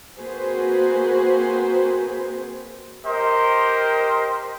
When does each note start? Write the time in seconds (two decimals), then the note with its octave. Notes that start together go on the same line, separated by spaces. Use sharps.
0.19 A#3 C4 F#4 G#4 B4 C5
3.05 G4 A#4 C5 D#5